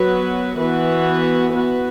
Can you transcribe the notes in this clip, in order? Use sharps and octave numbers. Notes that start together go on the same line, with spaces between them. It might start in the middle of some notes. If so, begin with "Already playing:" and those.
Already playing: F#3 B3 F#4 B4
E3 B3 F#4 B4
B3 F#4 B4